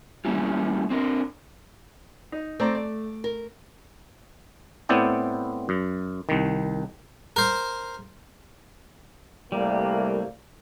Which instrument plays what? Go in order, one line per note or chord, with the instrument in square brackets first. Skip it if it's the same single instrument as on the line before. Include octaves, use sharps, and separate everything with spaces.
[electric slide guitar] G3 A3 A#3 C#4 E4 F4
C4 D4 A#4
[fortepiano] D#4
[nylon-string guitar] A3 [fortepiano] C4 D5 A#5
[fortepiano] D5
[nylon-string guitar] A#4
[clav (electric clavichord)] A2 B3 C4 E4 D5 G5
F#2
C2 D#3
[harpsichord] A#4 C5
[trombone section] C2 A3 A#3 [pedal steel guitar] G3